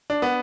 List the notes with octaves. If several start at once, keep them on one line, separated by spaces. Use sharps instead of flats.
D4
B3